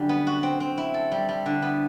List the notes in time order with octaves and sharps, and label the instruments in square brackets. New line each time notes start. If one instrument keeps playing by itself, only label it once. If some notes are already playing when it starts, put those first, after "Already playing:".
Already playing: [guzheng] F#2 D3 G3
B3
F#4
C4
C4
E4
A4
G3
G3
D3
B3